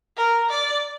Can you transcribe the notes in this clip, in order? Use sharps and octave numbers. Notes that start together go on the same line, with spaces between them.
A#4
D5